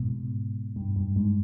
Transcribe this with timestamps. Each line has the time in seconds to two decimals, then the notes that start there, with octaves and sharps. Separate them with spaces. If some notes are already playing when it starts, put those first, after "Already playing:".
Already playing: G#2 B2
0.76 G2
0.96 G2
1.16 G#2